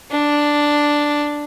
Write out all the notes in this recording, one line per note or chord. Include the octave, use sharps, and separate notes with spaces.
D4